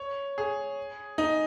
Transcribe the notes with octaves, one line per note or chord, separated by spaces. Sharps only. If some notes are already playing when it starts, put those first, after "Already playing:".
Already playing: C#5
G#4
D#4